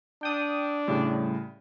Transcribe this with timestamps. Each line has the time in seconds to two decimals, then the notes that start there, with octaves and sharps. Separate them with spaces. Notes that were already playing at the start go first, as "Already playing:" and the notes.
0.23 D4 G5 D#6
0.88 A2 C#3 G3